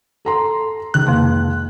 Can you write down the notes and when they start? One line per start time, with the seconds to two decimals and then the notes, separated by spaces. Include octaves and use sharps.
0.25 A4 A#5 C6
0.94 C#2 D#3 F#6
1.07 F2 C3 A#3